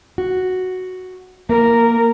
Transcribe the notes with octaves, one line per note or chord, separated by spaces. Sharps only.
F#4
A#3 A#4